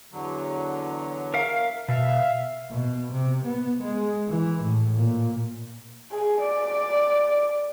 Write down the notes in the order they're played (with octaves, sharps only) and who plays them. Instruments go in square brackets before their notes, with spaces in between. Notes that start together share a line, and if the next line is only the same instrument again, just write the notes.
[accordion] E2 D3 F#3
[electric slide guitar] A#4 E5 F5
[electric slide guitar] B2 [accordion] E5 F5
[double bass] B2
C3
B3
G#3
E3
A2
A#2
[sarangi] G#4
D5